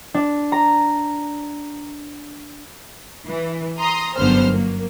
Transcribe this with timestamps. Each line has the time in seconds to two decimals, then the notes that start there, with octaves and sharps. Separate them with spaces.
0.14 D4
0.52 A#5
3.27 E3
3.78 A#5 C6 D#6
4.16 G1 F#2 D3 B3 C5 F6
4.51 F#3 A#3